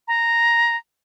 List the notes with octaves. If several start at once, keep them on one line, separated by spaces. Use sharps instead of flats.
A#5